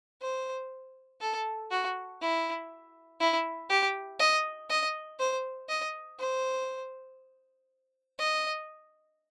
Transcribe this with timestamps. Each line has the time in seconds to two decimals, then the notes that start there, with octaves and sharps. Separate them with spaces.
0.22 C5
1.21 A4
1.71 F#4
2.22 E4
3.20 E4
3.70 G4
4.20 D#5
4.70 D#5
5.20 C5
5.69 D#5
6.20 C5
8.18 D#5